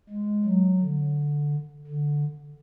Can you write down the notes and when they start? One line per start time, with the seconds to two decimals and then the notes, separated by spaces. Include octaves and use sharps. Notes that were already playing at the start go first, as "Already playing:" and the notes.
0.09 G#3
0.45 F#3
0.81 D3
1.87 D3